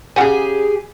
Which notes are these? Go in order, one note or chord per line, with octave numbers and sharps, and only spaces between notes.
C#3 G4 G#4 F#5 G#5